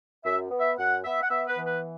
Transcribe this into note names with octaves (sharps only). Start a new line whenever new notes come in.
F#2 E5
B3
E5
F#2 F#5
B3 E5
F#5
B3 E5
B4
E3
B4